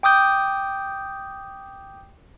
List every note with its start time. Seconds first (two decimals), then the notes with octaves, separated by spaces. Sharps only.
0.03 G5 D6 D#6 G6